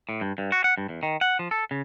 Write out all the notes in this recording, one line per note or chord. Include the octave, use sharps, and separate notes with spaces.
A2
G2
G2
F#4
F#5
G2
E2
D#3
F#5
F3
A4
C#3